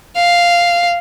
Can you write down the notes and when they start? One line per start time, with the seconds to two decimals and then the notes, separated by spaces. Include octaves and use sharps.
0.16 F5